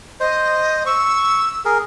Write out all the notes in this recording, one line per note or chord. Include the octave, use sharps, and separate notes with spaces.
C5 D#5
C#6 E6
G#4 A#4